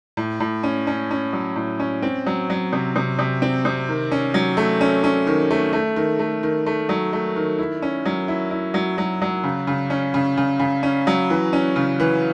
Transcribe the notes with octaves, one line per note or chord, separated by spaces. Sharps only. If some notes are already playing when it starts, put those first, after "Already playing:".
A2
A2
C#4
C#4
C#4
F#3
A2
C#4
C4
F#3
F#3
C3
C3
C3
C4
C3
D#3
C#4
F#3
A3
C#4
C#4
D#3
A3
A3
D#3
A3
D#3
A3
F#3
A3
D#3
E4
C#4
F#3
E4
E4
F#3
F#3
F#3
C#3
C#3
C#4
C#3
C#3
C#3
C#4
F#3
E3
C#4
C#3
E3